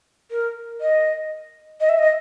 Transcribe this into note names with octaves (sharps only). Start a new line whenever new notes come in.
A#4
D#5
D#5
E5
D#5